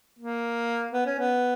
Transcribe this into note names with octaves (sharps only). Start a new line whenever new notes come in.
A#3
B3
C#4
B3